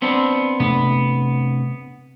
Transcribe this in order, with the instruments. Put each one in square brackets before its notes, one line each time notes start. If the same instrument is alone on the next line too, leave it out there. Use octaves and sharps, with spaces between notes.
[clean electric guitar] B3 C4 D4
[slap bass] C3 A3 D4 [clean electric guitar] B3